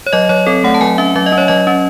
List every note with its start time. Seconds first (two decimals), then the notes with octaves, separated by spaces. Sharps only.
0.07 C#5
0.13 F#3 D#5
0.29 F#3 C#5
0.47 C4 A4
0.64 A3 F#5
0.74 A5
0.81 F#3 G#5
0.98 C#4 E5
1.16 F#3 E5
1.26 D#5
1.32 C#4
1.38 C#5
1.48 F#3 D#5
1.67 C#4